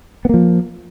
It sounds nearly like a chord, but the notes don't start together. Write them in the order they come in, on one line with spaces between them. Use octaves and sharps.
B3 A#3 F3